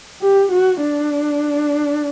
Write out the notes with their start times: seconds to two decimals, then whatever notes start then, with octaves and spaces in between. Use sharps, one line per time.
0.22 G4
0.52 F#4
0.81 D4